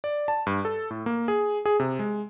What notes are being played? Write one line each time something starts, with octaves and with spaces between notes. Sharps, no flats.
D5
A5
G2
A4
A2
A#3
G#4
G#4
C3
G#3